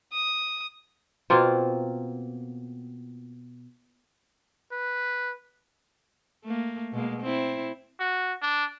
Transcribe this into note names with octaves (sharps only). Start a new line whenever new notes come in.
D#6
B2 A#3 C4 F4
B4
A3 A#3
B2 G#3 A#3
C4 E4
F#4
D4